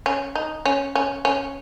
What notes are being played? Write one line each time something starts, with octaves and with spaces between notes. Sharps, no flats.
C#4
D#4
C#4
C#4
C#4